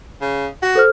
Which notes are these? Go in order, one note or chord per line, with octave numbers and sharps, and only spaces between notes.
C#3
F#4
A4 C5 F6